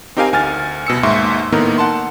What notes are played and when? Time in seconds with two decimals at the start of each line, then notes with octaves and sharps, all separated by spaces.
0.17 C4 D#4 G4 A#4 F5 G#5
0.33 D2 G#5 F6 A6
0.87 C2 B2 E6 C#7
1.03 D#2 G#2 E5 C6 C#6
1.52 A2 D#3 A#3 B3 D#4
1.78 F#5 A5 C6